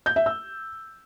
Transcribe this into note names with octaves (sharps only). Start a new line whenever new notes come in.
G6
E5
E6